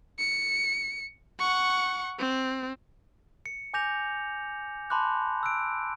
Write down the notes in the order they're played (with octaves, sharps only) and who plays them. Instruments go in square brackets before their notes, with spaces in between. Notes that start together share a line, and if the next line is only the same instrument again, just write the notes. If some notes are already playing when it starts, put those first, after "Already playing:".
[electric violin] C#7
F#5 C#6
C4
[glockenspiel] C#7
G#5 D6 G6 A#6 F7
A5 B5 C6 D6 F#6
E6 F#6 D7